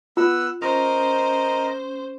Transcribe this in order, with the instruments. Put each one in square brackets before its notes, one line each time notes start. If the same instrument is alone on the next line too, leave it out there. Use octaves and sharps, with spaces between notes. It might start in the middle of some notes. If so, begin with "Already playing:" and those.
[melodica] B3 F#5 E6 [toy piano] F4
[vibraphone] C#4 [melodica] A#4 D#5 [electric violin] C5